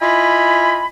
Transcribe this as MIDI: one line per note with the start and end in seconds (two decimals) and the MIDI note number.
0.02 0.86 64
0.02 0.86 65
0.02 0.86 75
0.02 0.86 80
0.02 0.86 83